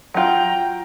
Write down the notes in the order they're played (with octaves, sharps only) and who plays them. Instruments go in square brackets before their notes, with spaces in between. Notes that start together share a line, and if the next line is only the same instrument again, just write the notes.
[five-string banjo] F#3 F4 [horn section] G5 A#5